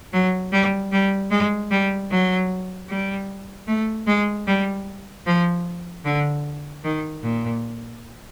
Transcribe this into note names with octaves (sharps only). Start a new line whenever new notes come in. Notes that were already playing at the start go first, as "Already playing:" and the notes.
F#3
G3
G3
G#3
G3
F#3
G3
A3
G#3
G3
F3
D3
D#3
A#2